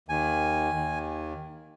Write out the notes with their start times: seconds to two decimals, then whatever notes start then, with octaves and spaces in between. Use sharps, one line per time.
0.09 D#2 D#3 G#5
0.73 D#2 D#3